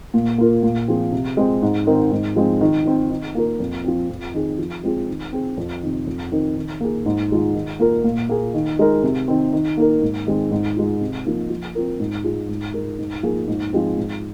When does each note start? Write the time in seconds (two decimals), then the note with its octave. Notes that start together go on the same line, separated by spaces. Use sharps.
0.14 A#2
0.38 A#3 F4 A#4
0.63 A#2
0.88 F3 C4 G#4
1.12 C3
1.37 G#3 C4
1.62 G#2
1.87 D#3 C4 D#4 A#4
2.12 G#2
2.36 F3 G#3 C4
2.61 D#3
2.85 C4 D#4
3.10 D#3
3.35 A#3 F4 A#4
3.60 F2
3.84 F3 C4
4.09 F2
4.34 D#3 C4 G#4
4.58 F3
4.83 G#3 C4 F4 G#4
5.08 D#3
5.33 C4 G#4
5.57 F2
5.82 C3 D#3
6.07 F2
6.31 D#3 C4 D#4 A#4
6.56 D#3
6.81 A#3 G#4
7.06 G#2
7.31 D#3 G#3 F4
7.55 D#3
7.80 A#3 F4 A#4
8.04 A#2
8.29 A#3 G#4
8.54 D#3
8.79 G#3 D#4 A#4
9.03 C3
9.28 D#3 C4
9.53 D#3
9.77 A#3 D#4 A#4
10.02 G#2
10.27 D#3 G#3 C4
10.51 G#2
10.76 G#3 F4
11.01 C3
11.25 F3 A#3 D#4
11.50 F3
11.75 C4 F4 A#4
12.00 G#2
12.24 G#3 F4 G#4
12.49 G#2
12.74 G#3 D#4 A#4
12.99 G#2
13.23 F3 A#3 F4 G#4
13.48 G#2
13.73 F3 G#3 C4
13.97 G#2